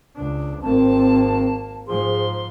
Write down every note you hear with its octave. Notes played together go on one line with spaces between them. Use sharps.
C#2 D4
G#1 A#3 C4 A5
G#2 F3 G#4 C6